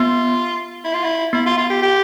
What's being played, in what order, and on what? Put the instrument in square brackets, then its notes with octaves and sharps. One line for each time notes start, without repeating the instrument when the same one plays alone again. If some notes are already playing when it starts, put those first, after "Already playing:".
Already playing: [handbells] B3 [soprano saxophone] F4
[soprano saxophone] E4
F4
E4
[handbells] B3 [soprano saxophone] E4
[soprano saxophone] F4
F4
G4
G4